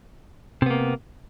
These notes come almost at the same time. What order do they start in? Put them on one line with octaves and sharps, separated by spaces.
C3 B3 A#3